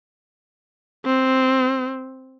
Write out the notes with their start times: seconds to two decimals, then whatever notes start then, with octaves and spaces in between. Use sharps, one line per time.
1.05 C4